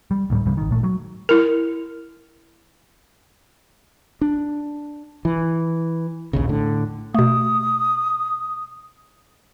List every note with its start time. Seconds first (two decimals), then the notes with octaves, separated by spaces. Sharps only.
0.11 G3
0.30 D2 A2 G3
0.45 C2 G2 C#3 G3
0.57 G#1 D#3
0.71 A#2 A3
0.83 F#3
1.29 E4 A#4
4.21 D4
5.25 E3
6.33 A#1 D#2 C#3
6.49 A2 D3
7.14 B2 A3 D#6